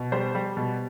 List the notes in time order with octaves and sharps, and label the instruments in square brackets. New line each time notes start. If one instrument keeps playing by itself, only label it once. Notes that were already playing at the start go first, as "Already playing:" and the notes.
Already playing: [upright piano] B2
G3 C5
G3
B2